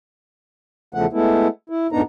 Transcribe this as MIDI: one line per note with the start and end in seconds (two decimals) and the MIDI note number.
0.94 1.06 40
0.94 1.06 49
0.94 1.06 53
0.94 1.06 57
0.94 1.06 78
1.13 1.47 56
1.13 1.47 57
1.13 1.47 59
1.13 1.47 64
1.69 1.87 64
1.92 2.01 42
1.92 2.01 45
1.92 2.01 59
1.92 2.01 62
1.92 2.01 63
1.92 2.01 82